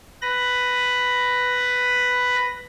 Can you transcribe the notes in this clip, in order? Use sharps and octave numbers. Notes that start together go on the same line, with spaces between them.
B4 B5 A#6